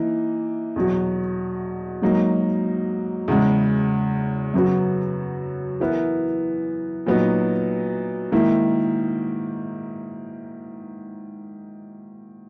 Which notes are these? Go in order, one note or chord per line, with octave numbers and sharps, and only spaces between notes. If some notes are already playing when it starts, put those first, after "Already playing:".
Already playing: E3 A#3 D#4
E2 B2 F#3
G#2 F#3 A#3 D#4
E2 C#3 G#3
F#2 C#3 F#3 B3 F#4
E3 B3 E4 A#4
A#2 F#3 B3 D#4
G#2 D#3 A#3 E4